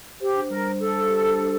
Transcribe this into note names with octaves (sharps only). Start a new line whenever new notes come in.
G4 C5
D4
G3 A#4
C5
A4 C5
C5
G4
D4
D4